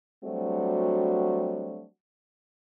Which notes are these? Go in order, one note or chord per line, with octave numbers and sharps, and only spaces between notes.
F#3 G3 A3 C4 D4 F#4